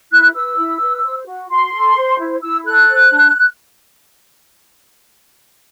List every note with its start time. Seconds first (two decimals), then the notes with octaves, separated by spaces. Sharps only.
0.10 E4 F#6
0.34 B4 E6
0.56 E4
0.79 B4
1.03 C5
1.26 F#4
1.48 F#4 C6
1.72 A4
1.95 C5
2.18 E4
2.41 E4 E6
2.64 A4 F#6
2.88 C5
3.11 D4